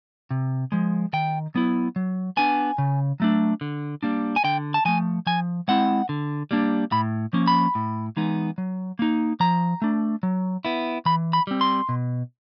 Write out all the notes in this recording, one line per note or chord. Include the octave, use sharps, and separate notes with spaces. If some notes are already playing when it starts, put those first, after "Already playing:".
C3
F3 G#3
D#3 G5
F#3 B3 E4
F#3
B3 D4 G#5
C#3
F#3 A3 D4
D3
G3 A#3 D4
G#5
D3 G5
A5
F3 A3 G#5
F3 G#5
G#3 C4 E4 F#5
D3
G3 A#3 D4
A2 B5
F3 A#3 C#4
B5
A2
E3 G#3 B3 D#4
F#3
A#3 D#4
F3 A#5
A3 D4
F#3
B3 E4
E3 B5
B5
G3 C4
C6
B2